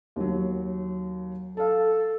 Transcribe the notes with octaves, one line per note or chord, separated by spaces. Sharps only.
D#2 F#3
A4 F5 A5